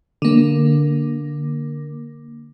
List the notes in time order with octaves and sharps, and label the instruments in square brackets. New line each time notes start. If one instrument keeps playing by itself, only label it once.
[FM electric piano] D3 A#3